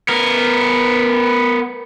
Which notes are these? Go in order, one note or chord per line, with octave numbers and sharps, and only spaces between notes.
B3 A#4